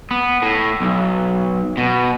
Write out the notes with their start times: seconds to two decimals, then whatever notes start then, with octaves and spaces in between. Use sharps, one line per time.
0.11 B3
0.42 A2
0.81 B1
1.77 B2